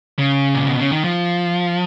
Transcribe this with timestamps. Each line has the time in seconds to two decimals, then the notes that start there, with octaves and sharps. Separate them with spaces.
0.19 C#3
0.55 A#2
0.67 B2
0.80 C#3
0.92 D#3
1.04 F3